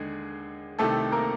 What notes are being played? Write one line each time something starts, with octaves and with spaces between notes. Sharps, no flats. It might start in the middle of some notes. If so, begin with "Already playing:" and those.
Already playing: D#2 D3 G#3 G#4
C2 C3 D#3 A3 A4
A#3 A#4